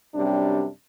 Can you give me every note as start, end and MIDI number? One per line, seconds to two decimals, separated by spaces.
0.15 0.66 42
0.15 0.66 48
0.15 0.66 55
0.15 0.66 62